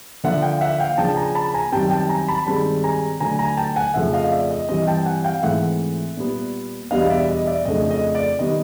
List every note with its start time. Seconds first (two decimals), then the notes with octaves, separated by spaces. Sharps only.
0.24 D3 F3 A#3 E5 F#5
0.42 F5 G5
0.61 E5 F#5
0.79 F5 G5
0.98 C#3 F3 A#3 D4 G5 A5
1.08 A5
1.17 G#5 A#5
1.35 A5 B5
1.54 G#5 A#5
1.72 F#2 D#3 G3 C4 G5 A5
1.90 G5 A5
2.09 G#5 A#5
2.28 A5 B5
2.46 G2 D#3 G#3 C4 A5 B5
2.84 G#5 A#5
3.20 D3 F#3 A3 G#5 A#5
3.39 G#5 A#5
3.57 G5 A5
3.76 F#5 G#5
3.94 F2 C#3 F3 A3 E5 F#5
4.13 D#5 F5
4.31 D5 E5
4.51 D#5
4.69 G2 E3 G3 C4 D#5
4.87 G5 A5
5.06 F#5 G#5
5.24 F5 G5
5.42 G#2 E3 A3 C4 E5 F#5
6.17 A#2 G3 B3
6.91 E2 B2 G3 B3 D4 D#5 F5
7.10 D5 E5
7.29 D#5
7.47 D5 E5
7.65 F2 C#3 F3 A3 D4 D#5
7.91 D#5
8.15 D5
8.39 D#3 G3 B3 D#5